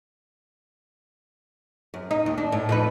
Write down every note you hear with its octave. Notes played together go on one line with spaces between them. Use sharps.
F#2
D#4
D#2
D4
A2
F2 D#4 B4